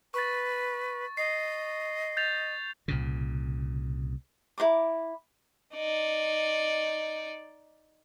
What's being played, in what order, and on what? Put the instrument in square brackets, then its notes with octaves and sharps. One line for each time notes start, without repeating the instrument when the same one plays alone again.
[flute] B4 [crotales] C#6 A6
[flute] D#5 [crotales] C7
[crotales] G6 A6 F7
[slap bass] C2 A#2 C#3
[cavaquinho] E4 C5 A#5 D6
[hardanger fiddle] D#4 D5